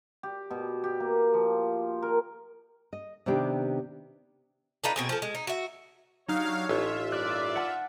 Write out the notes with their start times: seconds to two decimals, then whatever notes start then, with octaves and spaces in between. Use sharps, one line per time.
0.23 G4
0.50 B2
0.84 G4
1.00 A#3
1.34 F3
2.02 A#4
2.93 D#5
3.26 C3 D#3 B3 D4 G4
4.84 D4 D#4 F4 B4
4.96 B2 C4 G#4
5.09 F3 A4
5.22 G#3
5.35 D#4
5.47 F#4 E5
6.28 F#3 D4 D#4 G4 C#5 F5
6.69 A1 F4 E5
7.12 G2 A#4 D5 F#6
7.55 F#5 A5